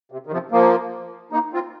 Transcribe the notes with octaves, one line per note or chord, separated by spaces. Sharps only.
C3
D#3
C3 F3
F3 A#3
A#3 D#4
C4 F4